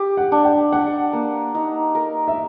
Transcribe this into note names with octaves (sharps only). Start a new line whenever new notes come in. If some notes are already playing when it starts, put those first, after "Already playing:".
Already playing: G4
F#5
D4
G5
D4 F#5
A#3
D#4
A#4
E5